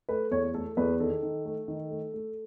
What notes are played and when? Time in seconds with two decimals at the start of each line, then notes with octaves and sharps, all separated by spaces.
0.09 A3 B4
0.31 E2 C#5
0.54 A3 A4
0.77 E2 B4
1.00 D#3 A4
1.22 D#3
1.45 A3
1.68 D#3
1.91 A3
2.14 A3